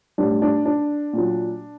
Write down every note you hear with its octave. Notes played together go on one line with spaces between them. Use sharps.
A2 G3 D4
D4
D4
A#2 F#3